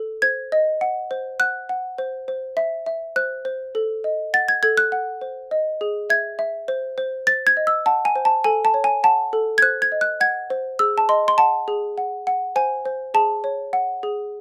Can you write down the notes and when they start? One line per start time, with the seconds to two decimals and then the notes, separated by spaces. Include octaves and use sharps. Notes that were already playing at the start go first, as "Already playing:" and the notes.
Already playing: A4
0.22 C5 G#6
0.52 D#5
0.81 F#5
1.11 C5
1.40 F#5 F#6
1.69 F#5
1.98 C5
2.28 C5
2.57 E5
2.86 E5
3.16 C5 F#6
3.45 C5
3.75 A4
4.04 D#5
4.34 F#5 A6
4.48 G#6
4.63 A4 G#6
4.77 F#6
4.92 F#5
5.21 C5
5.51 D#5
5.81 G#4
6.10 E5 G#6
6.39 E5
6.68 C5
6.98 C5
7.27 C5 A6
7.47 G#6
7.57 D#5
7.67 E6
7.86 F#5 A5
8.05 G#5
8.16 C5
8.25 A5
8.44 A4 G#5
8.65 A5
8.74 C#5
8.84 G#5
9.04 F#5 A5
9.33 A4
9.58 G#6
9.62 C5 F#6
9.82 G#6
9.92 D#5
10.01 F#6
10.21 F#5 G#6
10.50 C5
10.79 G#4 E6
10.98 A5
11.09 D#5 C6
11.28 C6
11.38 F#5 A5
11.68 G#4
11.98 F#5
12.27 F#5
12.56 C5 G#5
12.85 C5
13.14 G#4 A5
13.44 C#5
13.73 F#5
14.03 G#4